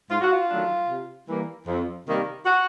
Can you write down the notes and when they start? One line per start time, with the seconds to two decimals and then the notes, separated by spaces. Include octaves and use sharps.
0.10 G#2 F4
0.21 F#4
0.31 F4
0.50 D#3 F#3 A3 D4
0.89 C3
1.28 E3 G3 A#3
1.67 F2
2.06 C3 D#3 G3 A#3
2.46 F#4